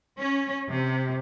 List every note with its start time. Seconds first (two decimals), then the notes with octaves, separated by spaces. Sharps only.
0.19 C#4
0.69 C3